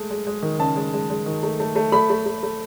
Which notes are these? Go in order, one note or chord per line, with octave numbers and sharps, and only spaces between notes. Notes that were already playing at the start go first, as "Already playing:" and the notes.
Already playing: G#3 A3
G#3
G#3
D#3
C#3 A5
G#3
G#3
G#3
D#3
A3
A3
A3
A3 B5
A3
A3
A3